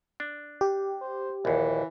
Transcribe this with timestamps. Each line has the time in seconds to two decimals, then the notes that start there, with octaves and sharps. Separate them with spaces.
0.20 D4
0.61 G4
1.01 C5
1.45 A#1 D#2 E3